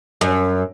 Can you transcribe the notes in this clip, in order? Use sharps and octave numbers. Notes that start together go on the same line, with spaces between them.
F#2